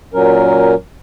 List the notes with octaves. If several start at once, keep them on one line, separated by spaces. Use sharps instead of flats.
A#2 F#3 C#4 A#4